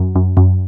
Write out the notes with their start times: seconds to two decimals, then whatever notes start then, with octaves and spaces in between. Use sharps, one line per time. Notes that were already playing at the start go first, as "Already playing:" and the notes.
Already playing: F#2
0.16 F#2
0.37 F#2